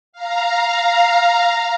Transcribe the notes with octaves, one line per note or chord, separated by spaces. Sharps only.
F5 A#5